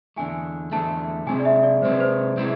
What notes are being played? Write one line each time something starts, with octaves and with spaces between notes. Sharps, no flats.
E2 D3 A3 G#5
E2 D3 A3 A5
C3 G#3 C4 G#5
D5
E5
E5
D5
C3 G#3 C4 C5
B4
C5
C3 G#3 C4 E4